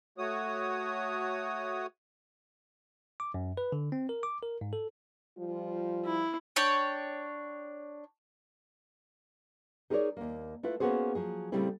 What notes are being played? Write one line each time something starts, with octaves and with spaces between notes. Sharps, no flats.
A3 F#4 C#5 D#6
D6
F#2
B4
D3
C4
A#4
D6
A#4
G#2
A4
F3 G3 F4
E4
D4 C#5 G5
D#4 G#4 A#4 B4 C#5 D5
D#2 A#3
A3 E4 F4 B4
A#3 B3 C#4 F#4 G#4 C5
F3 F#3 G#4
A#2 C#3 G3 A3 C4 E4